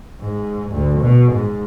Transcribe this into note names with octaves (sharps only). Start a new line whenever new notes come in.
G#2
D2
B2
G#2